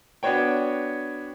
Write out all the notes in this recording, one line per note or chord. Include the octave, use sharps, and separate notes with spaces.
B3 D4 F#4 C#5 G5